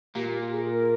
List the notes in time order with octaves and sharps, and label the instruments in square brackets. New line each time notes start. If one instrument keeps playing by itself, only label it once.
[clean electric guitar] A#2 A#3 [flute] G4
[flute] G4
G#4
A#4